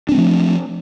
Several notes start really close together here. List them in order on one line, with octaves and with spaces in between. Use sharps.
D4 C4 A3 F3